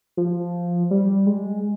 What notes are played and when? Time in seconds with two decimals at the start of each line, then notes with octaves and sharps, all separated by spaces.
0.17 F3
0.91 G3
1.26 G#3